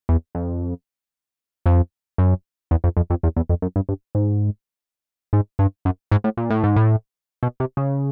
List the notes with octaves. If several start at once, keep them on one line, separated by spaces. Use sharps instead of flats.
E2
F2
F2
F#2
E2
F2
F2
F2
E2
E2
F2
F#2
G2
G2
G#2
G#2
G2
F#2
G#2
A2
A#2
A2
G#2
A2
B2
C3
C#3